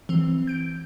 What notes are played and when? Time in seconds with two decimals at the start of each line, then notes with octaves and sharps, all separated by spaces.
0.09 E3 C4
0.47 G6 D7